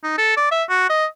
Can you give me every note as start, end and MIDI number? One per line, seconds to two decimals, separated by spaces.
0.03 0.13 63
0.18 0.33 69
0.37 0.51 74
0.52 0.63 76
0.69 0.85 66
0.90 1.06 75